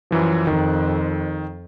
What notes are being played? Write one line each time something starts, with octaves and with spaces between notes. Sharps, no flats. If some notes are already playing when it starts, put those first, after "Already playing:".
F#2 E3 F3
F2 D#3